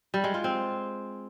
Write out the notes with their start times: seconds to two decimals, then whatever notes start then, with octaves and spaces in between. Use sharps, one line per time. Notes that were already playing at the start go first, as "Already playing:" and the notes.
0.14 G3
0.24 G#3
0.34 F4
0.44 C4